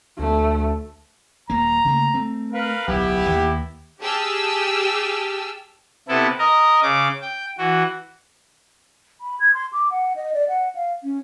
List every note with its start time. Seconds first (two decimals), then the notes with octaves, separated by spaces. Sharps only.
0.19 D2 A3
1.50 D#1 A#3 A#5
1.85 C#3 A3 A#3
2.14 A3 C4
2.53 A#4 B4 F5
2.88 D1 B1 B3 E4 G4
3.30 D#2 D#3 A#3
4.01 G4 G#4 G5 A5 E6 F6
6.08 C3 B3 E4 A4
6.39 A#4 D#5
6.83 C#3 D6
7.22 G5
7.58 E3 F#4
9.21 B5
9.40 G#6
9.54 C6
9.73 D6
9.91 F#5
10.16 D#5
10.34 D5
10.48 F#5
10.75 F5
11.03 C#4